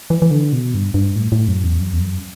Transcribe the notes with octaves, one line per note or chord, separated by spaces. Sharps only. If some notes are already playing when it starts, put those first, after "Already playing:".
E3
E3
D3
B2
G2
G2
A2
A2
F#2
E2
F#2
E2
F#2